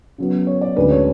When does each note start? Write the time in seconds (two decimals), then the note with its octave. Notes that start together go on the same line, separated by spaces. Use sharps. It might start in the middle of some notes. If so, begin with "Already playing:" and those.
0.18 C#3 F#3 B3
0.47 C#5
0.61 D5
0.76 D2 C#3 G#3 D4 B4
0.90 C#5